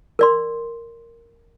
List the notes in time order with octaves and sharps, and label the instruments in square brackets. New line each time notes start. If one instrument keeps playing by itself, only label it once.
[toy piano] A#4 D5 C6